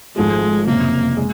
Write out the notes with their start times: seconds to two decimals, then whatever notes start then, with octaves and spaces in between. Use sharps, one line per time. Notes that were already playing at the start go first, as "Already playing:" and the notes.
0.16 G#1 G#2 F3 G#3 A3
0.67 F#1 F2 C3 A#3
1.17 G#3